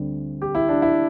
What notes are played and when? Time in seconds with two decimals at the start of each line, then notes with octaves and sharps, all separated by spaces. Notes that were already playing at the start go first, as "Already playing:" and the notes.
Already playing: D2 D3 G3 C4
0.42 G4
0.55 E4
0.69 D4
0.82 E4